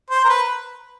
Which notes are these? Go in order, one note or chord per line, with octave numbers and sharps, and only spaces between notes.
C5
A#4
B4